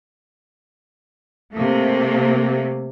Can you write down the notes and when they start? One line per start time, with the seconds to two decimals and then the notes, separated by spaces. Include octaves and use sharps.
1.53 C3 A3 A#3